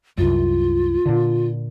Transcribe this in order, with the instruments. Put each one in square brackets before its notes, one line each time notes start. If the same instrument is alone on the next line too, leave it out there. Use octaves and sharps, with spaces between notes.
[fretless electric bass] C2 F#2 [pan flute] F4
[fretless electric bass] A#2 D3